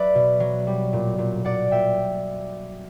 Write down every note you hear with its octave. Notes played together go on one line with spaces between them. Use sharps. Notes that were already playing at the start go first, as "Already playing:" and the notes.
Already playing: F#3 B4 D5 E5
B2
F#3
G3
A#2
A#2
A#2 D5 F#5
A#2 E5 G5